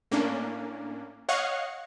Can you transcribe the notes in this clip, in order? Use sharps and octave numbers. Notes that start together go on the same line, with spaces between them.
A2 A#3 C#4 D4
C#5 D#5 F5 F#5 C#6